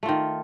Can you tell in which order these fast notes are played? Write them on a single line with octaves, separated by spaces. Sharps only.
A3 F4 D#3